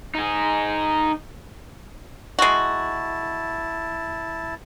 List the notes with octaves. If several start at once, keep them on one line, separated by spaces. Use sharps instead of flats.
D#4 G#4
G#3 E4 F#4 A5